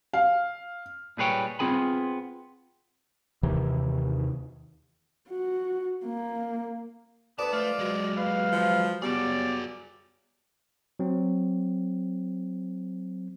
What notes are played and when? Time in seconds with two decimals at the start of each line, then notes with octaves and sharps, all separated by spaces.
0.13 F5
1.18 A#2 G3 G#4 B4 C#5 G5
1.59 B3 C4 F4 G#4 G#5 B5
3.43 D#2 C3 D#3 E3
5.29 F#4
6.05 A#3
7.39 D2 B3 B4 D5 A5
7.53 F3 A3 F4
7.79 F#3 G#3 F#4
8.18 B4 F5
8.52 F3
9.02 F#3 G3 B3 F#4 G#4 D5
10.99 F#3 C4